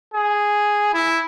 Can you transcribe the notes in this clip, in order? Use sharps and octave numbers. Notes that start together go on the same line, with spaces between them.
G#4
E4